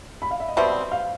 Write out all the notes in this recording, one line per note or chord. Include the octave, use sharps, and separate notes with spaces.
B5
F5
E5
D#5
B2 G3 C4 E5
F5